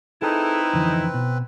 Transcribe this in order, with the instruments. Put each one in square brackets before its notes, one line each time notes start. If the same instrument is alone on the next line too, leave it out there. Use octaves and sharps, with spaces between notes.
[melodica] C4 B4 [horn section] D#4 E4 [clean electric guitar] G#4 A4
[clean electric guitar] F2 D3 E3
B2